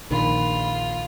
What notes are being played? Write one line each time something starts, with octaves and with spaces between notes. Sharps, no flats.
A#1 A#2 D#3 F4 B5